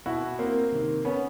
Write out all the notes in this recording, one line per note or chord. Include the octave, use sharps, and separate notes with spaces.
B2 E4 F#4
A#3 C4
C3 D#3
B3 C#4